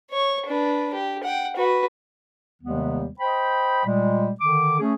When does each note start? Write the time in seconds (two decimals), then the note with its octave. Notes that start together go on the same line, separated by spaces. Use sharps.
0.10 C#5 C#6
0.46 D4 B4
0.94 G4
1.23 F#5 G5
1.56 F#4 B4
2.63 D#2 C3 D#3 G3 G#3 B3
3.20 C5 D#5 G5 B5
3.85 A#2 G3 G#3
4.41 D3 D#3 D6
4.80 A3 C#4 G#4